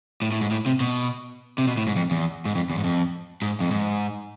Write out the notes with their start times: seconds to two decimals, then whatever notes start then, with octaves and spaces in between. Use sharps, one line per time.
0.22 A2
0.32 A2
0.41 G#2
0.51 A2
0.66 C3
0.80 B2
1.58 C3
1.67 B2
1.77 A2
1.87 G#2
1.96 F2
2.11 E2
2.45 G#2
2.55 F2
2.70 E2
2.78 G#2
2.84 F2
3.42 G#2
3.60 F2
3.71 G#2